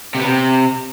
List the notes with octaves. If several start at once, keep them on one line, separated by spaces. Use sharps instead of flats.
C3
B3
C3